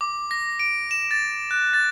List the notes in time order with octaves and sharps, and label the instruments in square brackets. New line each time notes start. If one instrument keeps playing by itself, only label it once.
[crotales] D6
A#6
D7
E7
A6
F#6
A6